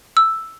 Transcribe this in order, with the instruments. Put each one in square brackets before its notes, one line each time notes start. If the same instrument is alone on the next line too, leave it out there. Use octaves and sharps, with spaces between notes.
[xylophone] E6